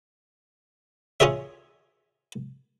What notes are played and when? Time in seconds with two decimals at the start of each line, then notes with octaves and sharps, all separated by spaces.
1.20 C#4 F4 G#4 C#5 E5